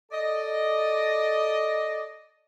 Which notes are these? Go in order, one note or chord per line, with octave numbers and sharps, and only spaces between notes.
A4 D5 D#5